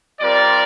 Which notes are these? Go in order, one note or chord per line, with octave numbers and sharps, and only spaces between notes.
G3 C4 F4 A#4 D5